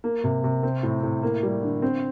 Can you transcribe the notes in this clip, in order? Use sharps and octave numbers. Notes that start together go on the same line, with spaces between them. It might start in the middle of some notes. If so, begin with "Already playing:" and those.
A#3
C3
C3
C4
A2
A2
A#3
G3
D3
C4